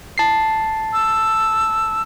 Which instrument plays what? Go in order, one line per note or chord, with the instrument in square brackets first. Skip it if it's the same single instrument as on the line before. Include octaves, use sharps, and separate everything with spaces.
[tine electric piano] A5 C7
[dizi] E6